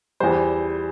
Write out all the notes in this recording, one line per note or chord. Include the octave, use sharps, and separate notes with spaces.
E2 E3 G3 C5